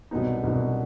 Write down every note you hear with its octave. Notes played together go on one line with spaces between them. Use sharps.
C2 B2 F#3 B3 D#4
C2 B2 F#3 B3 D#4